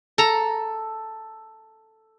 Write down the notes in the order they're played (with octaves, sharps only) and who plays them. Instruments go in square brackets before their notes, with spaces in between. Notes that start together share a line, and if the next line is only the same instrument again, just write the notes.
[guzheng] A4 A#5